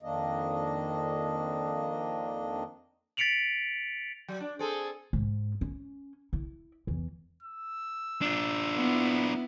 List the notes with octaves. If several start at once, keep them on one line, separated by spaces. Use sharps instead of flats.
F2 D#3 A#3 D4 D#5
A6 B6 C#7 D7 F7 F#7
F#3
D4
C4 G#4 A4
G#2
C#4
E4
E2 E3
E6
D4 F4
B3 E4